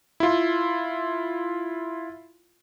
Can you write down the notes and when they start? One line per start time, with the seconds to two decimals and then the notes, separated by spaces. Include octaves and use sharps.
0.20 E4 F4